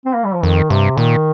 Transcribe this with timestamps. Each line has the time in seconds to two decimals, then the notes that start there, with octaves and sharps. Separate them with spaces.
0.05 C4
0.15 A#3
0.25 G3
0.34 F3
0.43 F2 D#3
0.70 G2 C3
0.97 A#2 D#3